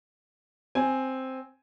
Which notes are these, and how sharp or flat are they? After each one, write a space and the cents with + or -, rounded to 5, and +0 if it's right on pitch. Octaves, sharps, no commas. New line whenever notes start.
C4 +0 G#5 +0